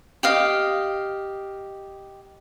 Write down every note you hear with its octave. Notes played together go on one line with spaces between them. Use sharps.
G4 D#5 F5